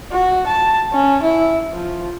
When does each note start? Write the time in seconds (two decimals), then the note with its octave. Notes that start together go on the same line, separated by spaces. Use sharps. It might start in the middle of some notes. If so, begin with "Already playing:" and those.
0.12 F#4
0.47 A5
0.93 C#4
1.22 E4
1.72 F3